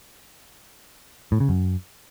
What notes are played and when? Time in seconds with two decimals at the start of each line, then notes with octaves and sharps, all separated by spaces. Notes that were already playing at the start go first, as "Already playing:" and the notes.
1.32 A2
1.40 C#3
1.49 F#2